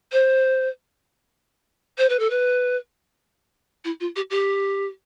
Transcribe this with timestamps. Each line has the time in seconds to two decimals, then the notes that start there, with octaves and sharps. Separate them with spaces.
0.12 C5
1.98 C5
2.09 B4
2.19 A4
2.30 B4
3.84 E4
4.00 F4
4.16 G4
4.30 G4